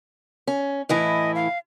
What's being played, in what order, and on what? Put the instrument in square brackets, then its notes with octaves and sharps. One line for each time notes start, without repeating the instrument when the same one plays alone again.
[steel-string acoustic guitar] C#4
[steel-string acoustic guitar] A2 E3 E4 [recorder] D#5
[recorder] F5